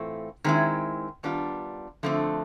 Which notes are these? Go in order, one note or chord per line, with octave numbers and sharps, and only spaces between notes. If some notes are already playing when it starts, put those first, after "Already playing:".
Already playing: A2 E3 A3 C4 F4
D#3 G#3 C4 E4
D#3 G3 B3 D4 F4
D3 F3 A3 C4